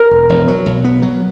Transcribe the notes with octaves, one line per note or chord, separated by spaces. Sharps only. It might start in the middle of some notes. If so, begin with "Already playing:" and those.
Already playing: A#4
E1
E1
F#3
B1
B3
F#3